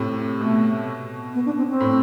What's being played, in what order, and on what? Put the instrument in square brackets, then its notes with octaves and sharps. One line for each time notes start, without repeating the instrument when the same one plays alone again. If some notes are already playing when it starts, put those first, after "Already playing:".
Already playing: [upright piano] A2 C3
[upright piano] B2 [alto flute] A3
[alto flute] B3
D4
C4
C4
[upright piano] A2